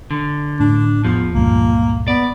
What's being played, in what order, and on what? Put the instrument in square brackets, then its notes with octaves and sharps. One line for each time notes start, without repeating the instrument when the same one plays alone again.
[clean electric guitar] D3
[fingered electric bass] A2 [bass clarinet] D4
[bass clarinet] E2 [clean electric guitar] F3
[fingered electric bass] C#2 G2 A#2 [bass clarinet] A#3
[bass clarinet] B3 [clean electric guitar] D5